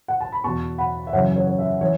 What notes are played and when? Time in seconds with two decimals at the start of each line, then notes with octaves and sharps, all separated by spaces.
0.08 F#5
0.21 A5
0.32 B5
0.44 E2 B2 A5 C#6
0.78 F#5 B5
1.07 E5
1.13 F#2 C#3 E3 C#5 F#5
1.36 C#5
1.47 C#5
1.59 E5
1.81 E3 C#5